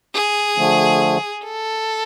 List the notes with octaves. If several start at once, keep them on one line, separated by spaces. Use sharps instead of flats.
G#4
D3 F3 A3
A4